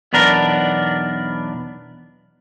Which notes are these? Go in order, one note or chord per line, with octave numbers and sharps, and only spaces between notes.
B1 E2 B3 D4 A#4